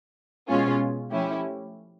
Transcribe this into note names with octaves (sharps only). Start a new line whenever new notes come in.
B2 G#3 C#4 F4
F3 A3 C#4 E4 G4